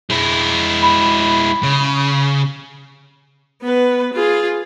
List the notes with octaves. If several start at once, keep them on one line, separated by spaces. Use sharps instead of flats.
G#3 E4
B5
C#3
B3 B4
F4 G#4